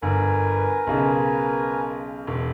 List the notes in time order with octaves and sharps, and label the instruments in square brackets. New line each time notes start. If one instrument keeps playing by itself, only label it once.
[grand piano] G1 [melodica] A#4 B4 G#5
[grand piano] B1 C#3
E1